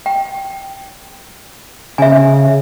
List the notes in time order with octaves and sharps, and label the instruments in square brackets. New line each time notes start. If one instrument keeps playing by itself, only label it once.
[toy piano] G5
[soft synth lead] C#3 [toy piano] E5 G#5